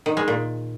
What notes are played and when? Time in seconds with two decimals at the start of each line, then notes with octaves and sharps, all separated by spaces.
0.06 D#3
0.17 G#3
0.28 A#2